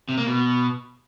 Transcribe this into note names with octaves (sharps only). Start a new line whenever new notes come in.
C3
A#3
B2